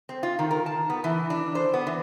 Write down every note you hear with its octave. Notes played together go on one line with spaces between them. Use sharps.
C4
F4
D#3
A#4
A5
B3
E3
D4
C5
B3
E3